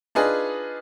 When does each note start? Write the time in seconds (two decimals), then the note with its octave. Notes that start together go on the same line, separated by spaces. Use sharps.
0.15 D4 D#4 F4 G#4 B4